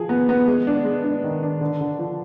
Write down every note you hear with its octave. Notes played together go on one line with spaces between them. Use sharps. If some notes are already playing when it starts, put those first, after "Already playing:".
Already playing: F3 G#4
B3
B3
G#3
D4
G#3
D4
D#3
D4
D3
D3
F3